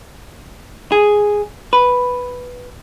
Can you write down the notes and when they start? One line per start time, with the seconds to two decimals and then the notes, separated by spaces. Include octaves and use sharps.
0.92 G#4
1.73 B4